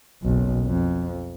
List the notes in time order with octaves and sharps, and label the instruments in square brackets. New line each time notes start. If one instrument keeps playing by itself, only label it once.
[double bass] F#1 B1
F2